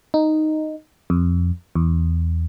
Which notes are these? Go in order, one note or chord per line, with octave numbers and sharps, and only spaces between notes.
D#4
F2
E2